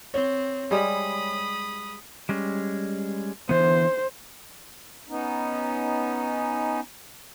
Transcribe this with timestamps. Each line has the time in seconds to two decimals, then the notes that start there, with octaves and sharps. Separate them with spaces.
0.14 C4 C#5
0.71 G3 G#3 B5 D#6
2.29 G3 G#3 C#4
3.49 D3 E3 B3 C5
5.07 B3 C#4 D#4